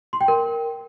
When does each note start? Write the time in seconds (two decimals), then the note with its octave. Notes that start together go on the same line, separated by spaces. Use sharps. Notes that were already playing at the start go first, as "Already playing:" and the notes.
0.13 C6
0.21 G5
0.28 A#4